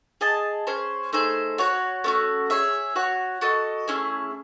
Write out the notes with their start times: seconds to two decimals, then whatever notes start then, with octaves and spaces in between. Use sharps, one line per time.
0.21 G#4 D#5 A5
0.67 C#4 G#4 C5
1.13 A3 D#4 G#4 C5
1.58 F#4 C#5 F#5
2.04 A3 C#4 F#4
2.50 G#4 C#5 E5
2.95 F#4 C#5 F#5
3.41 F#4 A4 D#5
3.88 A3 C#4 E4 G#4